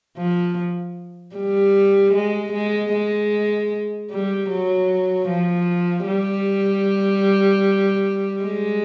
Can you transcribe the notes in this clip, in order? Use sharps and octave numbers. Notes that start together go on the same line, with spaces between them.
F3
G3
G#3
G#3
G#3
G3
F#3
F3
G3
G#3